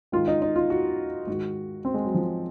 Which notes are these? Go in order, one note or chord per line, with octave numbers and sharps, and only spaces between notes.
G#2 D#3 F4
D#4
D#4
F4
F#4
G#2 D#3 F#4
C4
G#3
F#3
F3